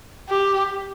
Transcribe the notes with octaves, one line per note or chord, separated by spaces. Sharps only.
G4